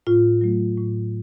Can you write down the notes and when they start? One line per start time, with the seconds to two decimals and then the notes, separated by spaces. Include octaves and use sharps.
0.07 A2 F4
0.41 F#3 A3
0.77 A2